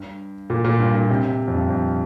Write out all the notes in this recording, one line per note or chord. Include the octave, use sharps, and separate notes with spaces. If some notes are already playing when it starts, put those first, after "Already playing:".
Already playing: G2
A#2
A#2
G2
A#2
C3
C3
F2
G2
F2